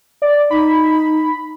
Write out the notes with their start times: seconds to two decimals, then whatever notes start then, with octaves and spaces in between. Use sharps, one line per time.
0.22 D5
0.51 D#4 B5